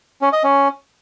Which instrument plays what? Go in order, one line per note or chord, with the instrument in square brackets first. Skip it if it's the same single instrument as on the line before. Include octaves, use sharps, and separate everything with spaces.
[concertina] C#4
D#5
C#4